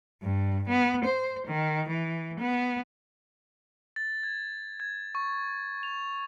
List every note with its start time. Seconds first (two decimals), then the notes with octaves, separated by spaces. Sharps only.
0.23 G2
0.69 B3
1.04 C5
1.47 D#3
1.88 E3
2.40 B3
3.96 A6
4.23 G#6
4.80 G#6
5.15 C#6
5.83 F7